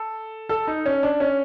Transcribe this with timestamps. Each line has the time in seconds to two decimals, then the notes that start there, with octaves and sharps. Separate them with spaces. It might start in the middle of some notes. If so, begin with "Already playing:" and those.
Already playing: A4
0.49 A4
0.67 D#4
0.86 C#4
1.03 D4
1.20 C#4